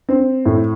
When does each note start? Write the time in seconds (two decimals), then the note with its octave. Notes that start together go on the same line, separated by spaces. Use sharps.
0.09 C4
0.46 A2